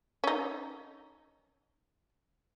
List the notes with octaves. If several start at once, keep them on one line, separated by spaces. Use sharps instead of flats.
C#4 D#4